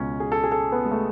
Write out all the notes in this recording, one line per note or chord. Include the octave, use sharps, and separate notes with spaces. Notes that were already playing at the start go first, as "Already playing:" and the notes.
Already playing: C#2 B2 C#4
G#4
A4
G#4
A4
B3
G#3
A3